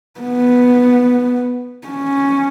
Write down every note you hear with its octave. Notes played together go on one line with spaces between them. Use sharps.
B3
C#4